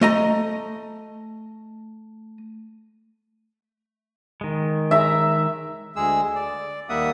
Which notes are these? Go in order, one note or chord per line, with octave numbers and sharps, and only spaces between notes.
A3 D#5 A#5
D#3 G#3
E5 A#5
D2 G#3 G#4 E6
D5
D#2 G3 A#3 E5 F#5 D#6